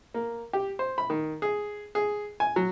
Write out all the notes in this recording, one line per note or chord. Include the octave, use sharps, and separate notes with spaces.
A#3
G4
C5
B5
D#3
G#4
G#4
G#5
F#3